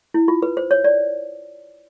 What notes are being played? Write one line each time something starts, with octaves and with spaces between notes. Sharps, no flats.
E4
F4
B4
C5
C#5
D5